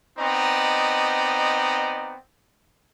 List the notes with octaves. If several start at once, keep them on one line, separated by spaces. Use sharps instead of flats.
B3 C4 D#4 D5 D#5 A#5